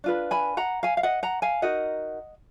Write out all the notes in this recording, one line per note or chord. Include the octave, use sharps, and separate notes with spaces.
D4 F4 B4
G#5 B5
F#5 A#5
F5 G#5
F5
D#5 F#5
F#5 A#5
F5 G#5
D#4 F#4 A#4 D#5 F#5